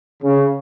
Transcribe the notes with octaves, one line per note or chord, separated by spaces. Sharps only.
C#3